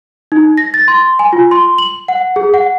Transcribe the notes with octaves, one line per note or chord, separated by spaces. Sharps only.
D#4
A#6
A6
C6
G#5
F4
C6
F#7
F#5
G#4
F#5